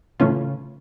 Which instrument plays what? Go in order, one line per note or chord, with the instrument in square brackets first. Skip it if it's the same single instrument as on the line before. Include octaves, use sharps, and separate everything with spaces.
[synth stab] A2 E3 A3 C#4 F4 [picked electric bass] C#3